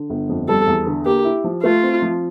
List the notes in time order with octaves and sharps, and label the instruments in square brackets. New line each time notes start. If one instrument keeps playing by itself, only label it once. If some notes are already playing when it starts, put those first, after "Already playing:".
Already playing: [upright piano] D3
G1
F2
[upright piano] G3 [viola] A4
[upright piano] E2
D3
[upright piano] A#3 [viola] G4
[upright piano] E4
F3
[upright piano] A3 [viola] F4
[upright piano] C4
F3